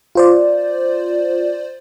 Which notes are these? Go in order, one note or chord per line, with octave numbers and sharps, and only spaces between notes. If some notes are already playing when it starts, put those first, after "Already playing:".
F4 C5 D5